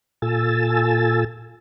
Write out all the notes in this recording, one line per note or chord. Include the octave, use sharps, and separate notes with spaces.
A#2 F4 A4 G#5 E6 A6